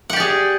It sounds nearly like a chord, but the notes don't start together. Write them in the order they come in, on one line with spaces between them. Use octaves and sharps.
F#5 G4 D5 G#4